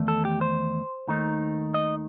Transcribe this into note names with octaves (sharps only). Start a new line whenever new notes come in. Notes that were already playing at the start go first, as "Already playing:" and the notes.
Already playing: E2 D#3 A3
A4
G4
C5
D#2 D#3 A3 D#4
D#5